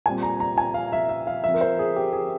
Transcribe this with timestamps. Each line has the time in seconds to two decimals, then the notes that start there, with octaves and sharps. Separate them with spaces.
0.06 A#2 G3 C4 G#5
0.23 A#5
0.40 A#5
0.58 G#5
0.74 F5
0.92 E5
1.09 E5
1.27 F5
1.44 F3 C4 E5
1.54 A#4
1.61 C5
1.79 G#4
1.96 G4
2.13 G#4